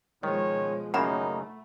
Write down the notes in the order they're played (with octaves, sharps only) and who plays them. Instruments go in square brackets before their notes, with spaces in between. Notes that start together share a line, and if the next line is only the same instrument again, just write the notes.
[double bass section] B2 F3 G#3 [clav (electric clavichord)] D#3 [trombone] C#5
[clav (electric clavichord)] F#2 C#3 A#3 [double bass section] A3 [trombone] D#4 [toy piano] F#5 A#5 B5